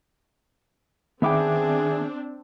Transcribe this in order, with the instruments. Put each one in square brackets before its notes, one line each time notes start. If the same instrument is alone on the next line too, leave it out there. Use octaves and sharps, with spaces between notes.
[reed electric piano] D#3 E5 D6 [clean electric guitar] B3 G5 [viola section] C4 D4 [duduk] G#4